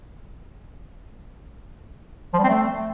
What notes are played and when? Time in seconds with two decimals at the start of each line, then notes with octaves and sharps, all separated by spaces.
2.34 F3
2.39 G3
2.44 C4
2.49 A3